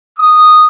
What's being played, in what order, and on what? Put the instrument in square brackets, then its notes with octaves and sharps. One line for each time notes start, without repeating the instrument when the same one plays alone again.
[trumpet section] D#6